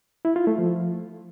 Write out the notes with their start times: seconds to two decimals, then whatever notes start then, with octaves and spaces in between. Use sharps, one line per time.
0.25 E4
0.36 F4
0.47 A3
0.58 F3